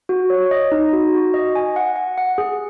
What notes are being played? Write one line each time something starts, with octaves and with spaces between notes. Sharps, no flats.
F#4
C#5
D#5
D#4
F#4
F#4
D#5
G#5
F#5
F#5
F#5
G#4